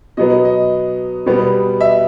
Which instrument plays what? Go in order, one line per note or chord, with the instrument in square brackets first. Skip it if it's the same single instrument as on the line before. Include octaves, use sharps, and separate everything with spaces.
[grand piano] B2 F#3 B3 D#5
D#5
B2 G3 B3
E5